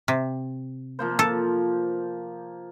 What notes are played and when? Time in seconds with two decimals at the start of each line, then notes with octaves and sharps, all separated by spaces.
0.08 C3
0.99 F3 A#3 C5
1.19 F3 A4